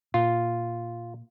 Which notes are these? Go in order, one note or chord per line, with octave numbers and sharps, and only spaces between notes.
A#2 F4